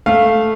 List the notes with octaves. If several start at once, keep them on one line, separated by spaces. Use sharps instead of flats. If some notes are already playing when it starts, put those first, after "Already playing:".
A3 F5